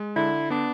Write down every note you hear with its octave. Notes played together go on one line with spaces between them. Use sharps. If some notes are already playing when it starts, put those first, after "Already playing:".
Already playing: G#3
D3 E4
B3 D4